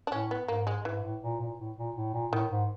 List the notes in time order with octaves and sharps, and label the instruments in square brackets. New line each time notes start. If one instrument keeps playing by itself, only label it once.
[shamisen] D4
[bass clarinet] A2 [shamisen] C#4
[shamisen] B3
[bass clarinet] G#2 [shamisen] A#3
[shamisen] G#3
[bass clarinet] G#2 [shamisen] E3
[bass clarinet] A2
A#2
A#2
A2
A#2
A2
A#2
[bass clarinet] A2 [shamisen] D#3
[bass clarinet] G#2